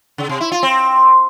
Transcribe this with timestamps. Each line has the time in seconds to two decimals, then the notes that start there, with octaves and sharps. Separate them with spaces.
0.18 C#3
0.29 C3
0.41 E4
0.52 F4
0.63 C4